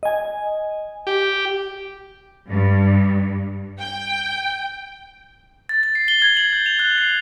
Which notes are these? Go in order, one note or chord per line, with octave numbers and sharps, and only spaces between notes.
D#5 G#5
G4
G2
G5
A6
A6
C7
G7
G#6
F#7
G6
F7
F#6
C7